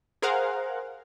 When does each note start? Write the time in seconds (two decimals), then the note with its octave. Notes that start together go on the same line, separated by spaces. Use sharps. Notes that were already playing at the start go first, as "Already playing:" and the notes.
0.22 G#4 A#4 C5 F5 F#5